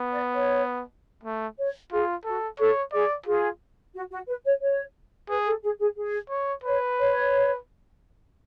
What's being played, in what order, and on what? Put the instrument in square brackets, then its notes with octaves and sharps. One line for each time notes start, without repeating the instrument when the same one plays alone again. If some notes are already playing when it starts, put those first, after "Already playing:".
Already playing: [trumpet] B3
[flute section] D5
C#5
[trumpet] A3
[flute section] C#5
[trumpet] F4 [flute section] G#4
[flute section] F#4 [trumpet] A4
[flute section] A4 [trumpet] C#5
[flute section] G#4 [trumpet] D5
[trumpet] F4 [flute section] G#4
[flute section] F#4
F#4
B4
C#5
C#5
[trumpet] G#4 [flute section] B4
[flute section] A4
G#4
G#4
G#4
[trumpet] C#5
[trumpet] B4 [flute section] C#5
[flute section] C#5